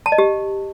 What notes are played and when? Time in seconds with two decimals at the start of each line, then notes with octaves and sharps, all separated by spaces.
0.06 A5
0.12 D#5
0.18 G4